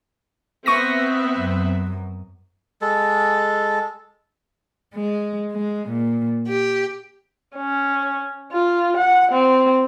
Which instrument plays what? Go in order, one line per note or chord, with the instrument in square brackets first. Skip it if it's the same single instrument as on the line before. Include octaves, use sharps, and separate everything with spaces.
[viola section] B3 C4 E5 [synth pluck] C#6 D#6 A#6
[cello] F#2
[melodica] G#3 A4
[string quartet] G#3
G#3
A#2
G4
[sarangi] C#4
F4
F#5
C4